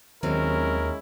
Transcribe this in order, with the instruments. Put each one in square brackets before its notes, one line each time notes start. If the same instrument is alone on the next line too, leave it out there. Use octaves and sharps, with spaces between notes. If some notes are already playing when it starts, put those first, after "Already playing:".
[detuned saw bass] D#2 [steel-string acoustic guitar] D#3 F#3 C4 [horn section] G#3 C#4 E4 [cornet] A#4